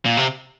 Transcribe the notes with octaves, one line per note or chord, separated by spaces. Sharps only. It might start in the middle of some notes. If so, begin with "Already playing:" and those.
A#2
C3